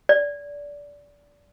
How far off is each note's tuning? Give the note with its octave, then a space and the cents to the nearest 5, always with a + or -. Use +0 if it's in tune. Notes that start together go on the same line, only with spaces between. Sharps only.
D5 -20